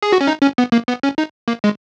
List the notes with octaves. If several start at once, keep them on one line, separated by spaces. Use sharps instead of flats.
G#4
F#4
C#4
D#4
C#4
B3
A#3
B3
C#4
D#4
A#3
G#3